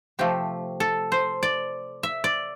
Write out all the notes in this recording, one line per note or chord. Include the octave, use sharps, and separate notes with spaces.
C3 F3 A3 G4
A4
C5
D5
E5
D5